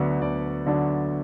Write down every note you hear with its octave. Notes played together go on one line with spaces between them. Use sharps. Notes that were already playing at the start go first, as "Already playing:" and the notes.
Already playing: D2 D3 F#3 B3 D4
D2 D5
D3 F#3 B3 D4